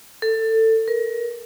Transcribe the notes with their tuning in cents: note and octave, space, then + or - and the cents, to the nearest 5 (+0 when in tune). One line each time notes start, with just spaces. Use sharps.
A4 +20
A#4 +30